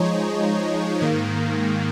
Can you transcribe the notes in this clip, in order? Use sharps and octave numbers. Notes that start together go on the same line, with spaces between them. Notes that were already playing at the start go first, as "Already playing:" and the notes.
Already playing: F3 G#3 D#4 C#5
G#2 D#3 A#3